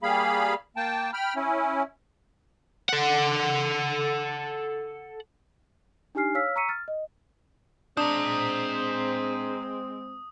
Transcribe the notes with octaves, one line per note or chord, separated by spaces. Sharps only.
G3 A#3 G#4 F5 B5
A#3 G5 A5
G5 B5 F6
C#4 E4
A4 F#5
D4 D#4 G4 G#5 F6 C7
C#5 F5 E6 F6 B6
A#5 C#6 E6 B6 C#7 D#7
F6 A6
D#5
G#3 C4 D4 C5 A#5 D#6